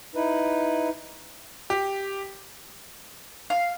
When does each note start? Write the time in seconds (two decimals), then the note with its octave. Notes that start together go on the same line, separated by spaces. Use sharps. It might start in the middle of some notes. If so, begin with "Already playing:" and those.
0.16 D#4 E4 B4
1.70 G4
3.50 F5